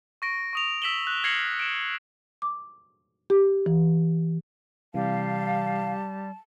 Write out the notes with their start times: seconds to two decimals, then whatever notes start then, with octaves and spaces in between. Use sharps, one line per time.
0.22 C#6 A#6 D7
0.53 C#6 D#6 F7
0.82 E6 B6 D7 E7 F#7 G7
1.07 F#6
1.24 F6 G#6 A#6 C7 C#7 F#7
1.60 D7 E7
2.42 D6
3.30 G4
3.66 E3
4.94 C3 E3 G3 F5 A5